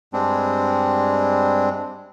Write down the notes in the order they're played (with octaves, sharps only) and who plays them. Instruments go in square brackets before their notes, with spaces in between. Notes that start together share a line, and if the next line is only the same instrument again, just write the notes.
[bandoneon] G2 G3 G#3 C4 D4